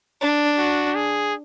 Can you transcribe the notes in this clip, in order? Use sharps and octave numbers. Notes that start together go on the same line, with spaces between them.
D4
F#4
G#4